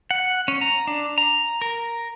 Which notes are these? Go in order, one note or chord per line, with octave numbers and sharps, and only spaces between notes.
F#5
C#4
A#5
D4
A#5
A#4